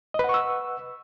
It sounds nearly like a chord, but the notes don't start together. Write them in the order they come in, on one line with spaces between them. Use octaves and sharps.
D#5 B4 F#5 C#6 E6